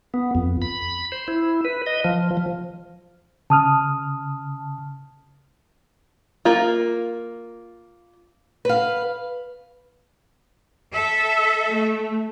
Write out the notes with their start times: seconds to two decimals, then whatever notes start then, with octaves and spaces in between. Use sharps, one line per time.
0.14 B3
0.35 F2
0.62 B5
1.12 C5
1.28 E4
1.65 B4
1.86 D#5
2.04 F3
2.37 F3
3.50 C#3 A5 D#6 F6
6.45 A#3 F4
8.65 B4 F5
10.92 A4 E5
11.68 A3